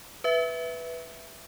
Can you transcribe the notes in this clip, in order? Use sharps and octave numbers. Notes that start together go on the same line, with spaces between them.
B4 E5